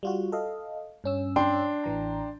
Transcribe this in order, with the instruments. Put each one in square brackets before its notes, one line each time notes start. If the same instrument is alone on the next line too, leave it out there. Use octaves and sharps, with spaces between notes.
[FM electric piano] G3 F4 F#4
A4 D#5 F5
G2 C#4 E6
[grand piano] D4 G5 C6
[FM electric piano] A1 E3 A#5